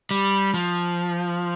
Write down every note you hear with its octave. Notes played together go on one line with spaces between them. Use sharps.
G3
F3